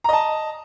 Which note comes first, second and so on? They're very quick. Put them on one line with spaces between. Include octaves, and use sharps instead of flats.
A#5 D#5 A5